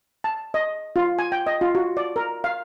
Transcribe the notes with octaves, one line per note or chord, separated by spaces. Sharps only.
A5
D#5
F4
G#5
G5
D#5
F4
F#4
D5
A#4
F5